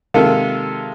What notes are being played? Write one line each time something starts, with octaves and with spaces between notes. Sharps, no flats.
C3 D#3 G#3 A#3 F4 A4